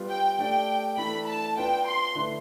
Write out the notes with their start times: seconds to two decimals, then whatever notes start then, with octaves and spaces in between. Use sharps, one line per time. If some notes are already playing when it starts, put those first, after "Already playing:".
Already playing: G3 B3 F4 B4
0.09 G5
0.39 A3 D4 G4 D5 G5
0.97 E3 A3 D4 A4 B5
1.27 A5
1.57 B3 D4 F4 B4 D5 G5
1.86 C6
2.15 D3 A3 E4 B4